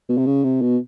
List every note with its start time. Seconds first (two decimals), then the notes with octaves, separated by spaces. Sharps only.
0.09 B2
0.18 C3
0.26 C#3
0.44 C3
0.62 B2